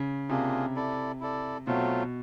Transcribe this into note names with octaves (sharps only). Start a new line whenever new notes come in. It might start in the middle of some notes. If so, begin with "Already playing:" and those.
Already playing: C#3
C3 A#3 D4 F4 G#4
E4 A4 D5
E4 A4 D5
B2 F#3 A3 C4 F4